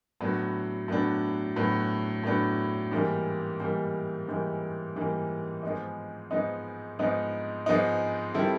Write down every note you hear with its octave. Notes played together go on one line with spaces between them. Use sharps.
A2 F#3 B3 D4
A2 F#3 B3 D4
A2 F#3 B3 D4
A2 F#3 B3 D4
G#2 E3 G3 A#3
G#2 E3 G3 A#3
G#2 E3 G3 A#3
G#2 E3 G3 A#3
G#2 F3 G#3 B3 D#4
G#2 F3 G#3 B3 D#4
G#2 F3 G#3 B3 D#4
G#2 F3 G#3 B3 D#4
D#3 G3 C4 E4 A4